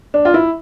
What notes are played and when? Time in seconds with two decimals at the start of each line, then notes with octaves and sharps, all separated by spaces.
0.14 D4
0.25 F4
0.34 E4